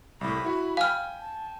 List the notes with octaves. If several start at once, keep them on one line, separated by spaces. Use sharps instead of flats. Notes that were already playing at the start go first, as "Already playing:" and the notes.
C2 A2 B5
E4 F#4
F5 G5 G#5 F6
A5